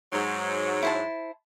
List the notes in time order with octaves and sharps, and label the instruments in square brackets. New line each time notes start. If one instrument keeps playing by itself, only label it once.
[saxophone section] G#2 F#3
[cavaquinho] E4 C5 A5